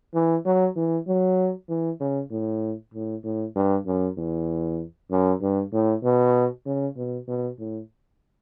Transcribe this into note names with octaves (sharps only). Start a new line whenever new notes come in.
E3
F#3
E3
F#3
E3
C#3
A2
A2
A2
G2
F#2
E2
F#2
G2
A2
B2
C#3
B2
B2
A2